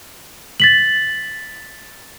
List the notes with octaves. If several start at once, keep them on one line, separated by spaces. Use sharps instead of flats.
A6 B6 F#7